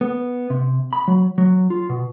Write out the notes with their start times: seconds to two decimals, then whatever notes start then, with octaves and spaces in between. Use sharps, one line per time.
0.01 B3
0.50 C3
0.93 B5
1.08 F#3
1.38 F#3
1.70 F4
1.89 B2